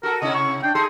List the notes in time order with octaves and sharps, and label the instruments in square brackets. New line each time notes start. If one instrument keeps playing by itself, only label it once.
[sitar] F#4 A4 [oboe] A#4
[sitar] C3 C#4 E4 [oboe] D#5
[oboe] C#6
[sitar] D4 [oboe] G5
[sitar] D#4 G#4 A4 [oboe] C6